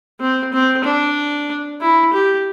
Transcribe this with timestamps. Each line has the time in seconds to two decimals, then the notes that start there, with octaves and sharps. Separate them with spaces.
0.20 C4
0.53 C4
0.84 D4
1.81 E4
2.13 G4